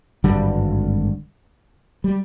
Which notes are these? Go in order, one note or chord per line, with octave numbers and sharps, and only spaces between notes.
G#1 G2 D3 G3
G3